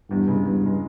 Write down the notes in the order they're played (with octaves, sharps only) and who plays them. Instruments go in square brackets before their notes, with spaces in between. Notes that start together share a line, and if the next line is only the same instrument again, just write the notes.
[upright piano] E2 [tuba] G2
[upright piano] C#3 G#3
[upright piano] E2 [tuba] G2
[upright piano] C#3 G#3